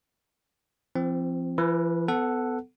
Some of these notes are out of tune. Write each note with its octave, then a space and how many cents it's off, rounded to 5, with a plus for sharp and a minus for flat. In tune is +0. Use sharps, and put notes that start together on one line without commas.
F3 -35 C4 +0
E3 +45 B4 -15
B3 +30 A4 +0 F#5 +0